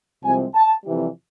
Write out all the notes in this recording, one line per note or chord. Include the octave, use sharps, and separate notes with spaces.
C2 C3 F3 G#3 C4 G#5
A5
F2 C3 E3 G3